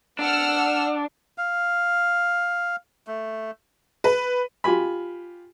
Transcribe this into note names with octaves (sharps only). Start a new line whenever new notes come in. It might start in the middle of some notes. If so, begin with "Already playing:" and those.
D4 F#5 E6 F6
F5
A3
B4
F4 G4 G#5 B5